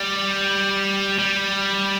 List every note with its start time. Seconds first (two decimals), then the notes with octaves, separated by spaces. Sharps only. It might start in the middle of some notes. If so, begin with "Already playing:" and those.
Already playing: G3
1.19 G3